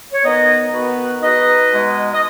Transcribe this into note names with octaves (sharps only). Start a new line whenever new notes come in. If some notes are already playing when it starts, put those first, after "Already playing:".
C#5
D#3 B3 D#4 B4 D#5
D#3 B3 D#4 F#4 B4
B2 G#3 D#4 B4 D#5
B2 G#3 D#4
D#5